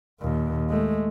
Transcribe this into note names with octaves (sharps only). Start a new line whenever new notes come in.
D#2 A#2
G#3 A3